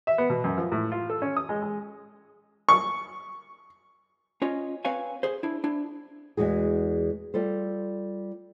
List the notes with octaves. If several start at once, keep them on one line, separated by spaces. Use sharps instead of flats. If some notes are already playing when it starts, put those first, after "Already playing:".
E5
B3
B2
F#2
F3
A2
F4
A4
C#4
D#6
G#3
G#3
C#6
C#4 F4 C#5 D#5
C4 B4 C#5 F5 G#5
G#4 C5
D4 E4
D4 E4
E2 G#3 F#4 G#4
G3 F4 A4 C5